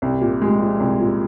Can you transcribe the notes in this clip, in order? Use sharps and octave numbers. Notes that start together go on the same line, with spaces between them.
C2
A#2
G#3
F3
C2
A#2